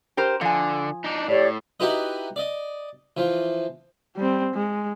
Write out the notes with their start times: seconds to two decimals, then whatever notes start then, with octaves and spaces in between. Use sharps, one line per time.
0.17 G4 A#4 C5
0.41 D3 F3 G#5
1.04 D4 D#4
1.28 A2 G4 C#5 D5
1.80 D#4 E4 F#4 G4 B4 D#5
2.36 D5 D#5
3.17 E3 F3
4.16 G3 C4
4.54 G#3